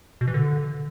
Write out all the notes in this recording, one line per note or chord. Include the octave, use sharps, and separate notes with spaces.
B2
E3
D3